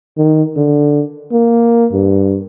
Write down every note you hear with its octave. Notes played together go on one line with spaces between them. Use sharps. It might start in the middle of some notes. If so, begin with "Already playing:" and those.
D#3
D3
A#3
G2